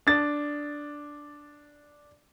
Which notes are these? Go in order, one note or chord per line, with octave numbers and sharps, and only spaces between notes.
D4 A6